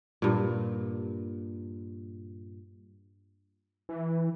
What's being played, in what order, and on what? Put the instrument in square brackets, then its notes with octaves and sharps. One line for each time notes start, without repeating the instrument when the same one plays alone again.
[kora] G2 A#2
[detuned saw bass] E3